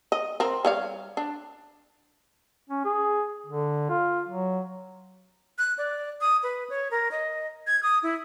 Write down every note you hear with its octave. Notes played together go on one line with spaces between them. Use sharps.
D#5
C4 A#4
G3 C#5 F5
D4
C#4
G#4
D3
F4
F#3
F#6
D5
D#6
B4
C#5
A#4
D#5
G#6
D#6
E4